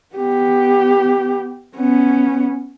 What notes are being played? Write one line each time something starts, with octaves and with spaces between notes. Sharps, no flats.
B3 G4
B3 C#4